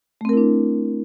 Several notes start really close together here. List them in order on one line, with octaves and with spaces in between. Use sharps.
A3 C4 A#4 E4 D4